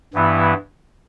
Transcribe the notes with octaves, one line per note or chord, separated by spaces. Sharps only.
G2 E3 B3 E4